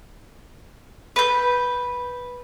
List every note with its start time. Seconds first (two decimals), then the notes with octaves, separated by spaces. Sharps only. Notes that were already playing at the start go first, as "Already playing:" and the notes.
1.16 B4 G6